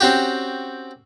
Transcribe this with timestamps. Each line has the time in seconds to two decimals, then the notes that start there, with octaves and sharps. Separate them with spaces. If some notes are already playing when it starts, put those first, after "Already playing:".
0.01 C4 C#4 F#4 G4